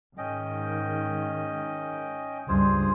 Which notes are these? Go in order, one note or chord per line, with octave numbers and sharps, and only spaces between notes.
G#2 D#3 C#4 D#5 G5
C#2 G2 F4 G#4 C5